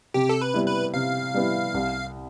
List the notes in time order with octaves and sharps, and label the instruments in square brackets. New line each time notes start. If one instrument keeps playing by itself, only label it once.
[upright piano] C3 [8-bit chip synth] G4
[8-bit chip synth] A4
B4
[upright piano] G3 B3 E4
[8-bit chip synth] B4
[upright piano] C3 [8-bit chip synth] F5
[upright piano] G3 B3 E4
C2